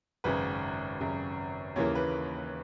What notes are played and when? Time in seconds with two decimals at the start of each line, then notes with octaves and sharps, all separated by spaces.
0.24 G#1 F#2 C#3 B4
1.00 G#1 F#2 C#3
1.76 D#2 C#3 E3 A#3 C#5
1.95 B4